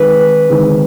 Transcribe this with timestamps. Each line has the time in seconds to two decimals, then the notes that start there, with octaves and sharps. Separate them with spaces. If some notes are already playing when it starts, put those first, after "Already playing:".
Already playing: D#3 G#3 C4 B4
0.49 D#3 G#3 C4